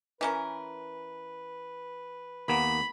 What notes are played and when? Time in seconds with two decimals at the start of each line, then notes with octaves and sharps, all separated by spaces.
0.21 E3 C#4 A#4 B4
2.48 D#2 A#3 B3 B5